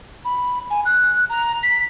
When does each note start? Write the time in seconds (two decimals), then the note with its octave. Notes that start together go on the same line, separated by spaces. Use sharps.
0.25 B5
0.70 G#5
0.85 F#6
1.30 A#5
1.63 B6